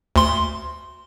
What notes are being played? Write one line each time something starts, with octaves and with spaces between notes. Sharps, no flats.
D2 C6